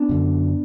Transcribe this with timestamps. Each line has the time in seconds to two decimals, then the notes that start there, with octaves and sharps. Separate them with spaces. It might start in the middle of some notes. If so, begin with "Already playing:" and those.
Already playing: B3 D4
0.09 F#2 D3